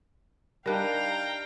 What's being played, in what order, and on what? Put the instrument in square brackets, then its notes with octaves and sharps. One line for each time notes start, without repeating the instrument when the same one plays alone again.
[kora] G3 D4 D#4 [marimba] A#4 F#6 [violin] F5 A#5 [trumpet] G5